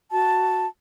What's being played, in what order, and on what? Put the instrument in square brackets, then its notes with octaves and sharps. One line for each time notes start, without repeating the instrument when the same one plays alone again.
[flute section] F#4 A5